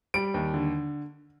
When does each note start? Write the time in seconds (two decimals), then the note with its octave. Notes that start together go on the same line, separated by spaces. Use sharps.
0.14 G3 D7
0.34 D#2
0.54 D3